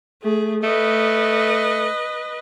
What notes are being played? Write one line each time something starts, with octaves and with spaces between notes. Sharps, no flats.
A3 G#4
A3 B4 D#5